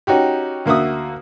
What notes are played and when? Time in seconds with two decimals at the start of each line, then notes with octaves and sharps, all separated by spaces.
0.07 C#4 D#4 F#4 G4
0.66 D2 A#3 F#4 E5 D#6